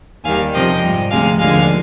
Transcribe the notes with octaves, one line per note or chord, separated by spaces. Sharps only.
D#2 D#3 G3 F5 G#5
F2 C3 F3 D#5 G5
G3
G#2
D2 C3 F3 G#3 F5 G#5
D#2 D3 F3 G#3 F5 G#5